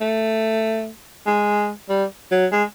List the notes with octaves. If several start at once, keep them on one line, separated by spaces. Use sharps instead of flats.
A3
G#3
G3
F#3
G#3